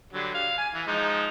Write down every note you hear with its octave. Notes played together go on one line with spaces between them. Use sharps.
D3 F#3 G3
F5
G#5
E3
F3 G#3 D#4